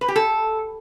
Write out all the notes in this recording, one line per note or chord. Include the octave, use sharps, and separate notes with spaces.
B4
G4
A4